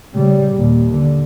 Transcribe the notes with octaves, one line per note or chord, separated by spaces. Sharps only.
C#3 G3
D#2 A#2
D3